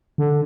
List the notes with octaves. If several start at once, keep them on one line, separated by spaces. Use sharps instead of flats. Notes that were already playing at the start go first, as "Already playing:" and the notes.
D3